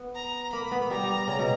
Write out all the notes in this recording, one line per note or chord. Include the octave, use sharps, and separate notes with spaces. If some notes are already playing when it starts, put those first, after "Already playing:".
Already playing: B3
A#5
A#3 B5
B3
G3 A#5
G3
C#3
B2